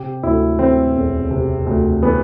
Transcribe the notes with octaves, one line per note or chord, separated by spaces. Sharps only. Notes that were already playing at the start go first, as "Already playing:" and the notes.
Already playing: C3 G4
D2 E4
E3 C4
E1
C3
D2
E3 B3